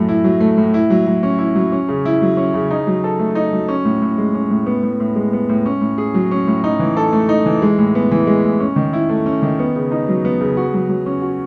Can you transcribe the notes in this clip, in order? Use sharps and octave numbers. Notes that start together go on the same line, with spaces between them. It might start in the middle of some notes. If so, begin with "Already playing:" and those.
Already playing: F#2 A2 A3
E4
F#3
A3
A2
E4
F#3
F#3
C#4
E4
F#3
C#4
C#3
E4
F#3
C#4
C#3
D#4
F#3
A4
A3
D#4
F#3
C#4
A2
A2
G#3
C#4
A2
B3
A2
A2
G#3
B3
A2
C#4
A2
G#4
F#3
C#4
A2
D#4
E3
A4
A3
D#4
E3
G#3
A2
B3
E3
G#3
A2
C#4
D#3
E4
A3
C#4
D#3
B3
C#3
D#4
F#3
B3
C#3
F#4
F#3
F#3
C#4
F#4